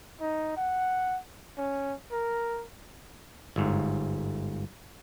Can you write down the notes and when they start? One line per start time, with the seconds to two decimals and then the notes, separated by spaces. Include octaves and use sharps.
0.21 D#4
0.57 F#5
1.58 C#4
2.12 A#4
3.56 G1 G#2